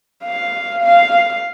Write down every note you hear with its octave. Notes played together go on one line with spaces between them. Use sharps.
F5
F5